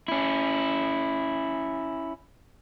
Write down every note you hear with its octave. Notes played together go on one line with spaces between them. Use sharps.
C#4 E4